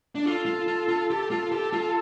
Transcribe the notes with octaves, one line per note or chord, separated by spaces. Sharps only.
D4
F4 A4
F4
F4
F4
G4
F4
G4 A4
F4